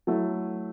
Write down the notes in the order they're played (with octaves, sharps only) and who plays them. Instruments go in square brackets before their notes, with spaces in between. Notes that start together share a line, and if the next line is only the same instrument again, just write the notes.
[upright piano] F#3 A3 E4